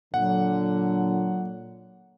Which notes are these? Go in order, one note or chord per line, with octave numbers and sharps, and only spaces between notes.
A#2 D3 F#3 F#5